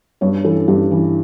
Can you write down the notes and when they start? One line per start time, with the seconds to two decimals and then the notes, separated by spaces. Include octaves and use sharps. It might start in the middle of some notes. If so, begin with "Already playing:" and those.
0.21 G2 C#5
0.44 E3 A4
0.68 G2 G4
0.91 E3